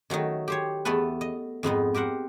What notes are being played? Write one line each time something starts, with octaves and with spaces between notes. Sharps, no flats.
D#3 F#3 A3 D#4
G4 C5 C#5
E2 A3 B3 A4 B4
D#5
F2 G#2 B3 D#4
G4 A#4 C5 F#5